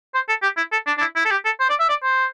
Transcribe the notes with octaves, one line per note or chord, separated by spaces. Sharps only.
C5
A4
G4
E4
A4
D4
D4
E4
E4
A4
G4
A4
C5
D5
E5
D5
C5